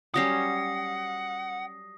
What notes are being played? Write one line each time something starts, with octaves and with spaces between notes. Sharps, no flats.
F#3 G3 C#4 F#5 D#6 A#6 C7